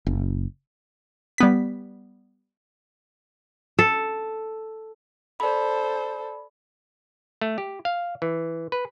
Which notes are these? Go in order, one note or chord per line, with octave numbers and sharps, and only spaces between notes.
F#1
G3 B3 B6
A4
A4 C5 D5 B5
A3
G4
F5
E3
B4